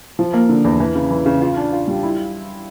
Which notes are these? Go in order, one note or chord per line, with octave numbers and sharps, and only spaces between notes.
F3
A#3
D3
E2
E3
C#3
E3
C#3
F4
D4
F4
G3
E4